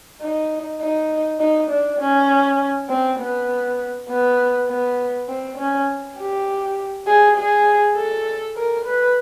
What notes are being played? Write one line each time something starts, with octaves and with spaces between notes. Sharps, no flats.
D#4
D#4
D#4
D4
C#4
C4
B3
B3
B3
C4
C#4
G4
G#4
G#4
A4
A#4
B4